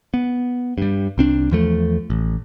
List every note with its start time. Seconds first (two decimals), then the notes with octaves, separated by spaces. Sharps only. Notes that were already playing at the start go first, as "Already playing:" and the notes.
0.14 B3
0.78 G2 G3
1.18 C2 C4 D4
1.51 E2 F3 A3
2.10 A1